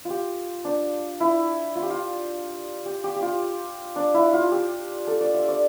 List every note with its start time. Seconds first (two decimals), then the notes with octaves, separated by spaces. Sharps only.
0.05 F4
0.10 G4
0.65 D4
1.20 E4
1.75 F4
1.83 G4
1.90 F4
2.86 G4
3.04 G4
3.16 G4
3.22 F4
3.96 D4
4.14 E4
4.33 F4
4.51 G4
5.07 A4
5.21 D5
5.34 E5
5.48 D5